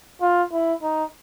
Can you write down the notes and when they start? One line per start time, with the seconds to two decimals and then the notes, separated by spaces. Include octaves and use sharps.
0.21 F4
0.52 E4
0.83 D#4